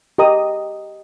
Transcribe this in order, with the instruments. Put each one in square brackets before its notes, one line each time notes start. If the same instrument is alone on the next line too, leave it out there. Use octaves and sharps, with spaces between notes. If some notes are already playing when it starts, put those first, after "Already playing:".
[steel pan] G4 A#4 D#5 A#5 D#6